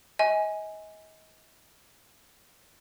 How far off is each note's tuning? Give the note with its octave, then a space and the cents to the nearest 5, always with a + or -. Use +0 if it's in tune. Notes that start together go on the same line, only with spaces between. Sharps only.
D#5 +35 G#5 +0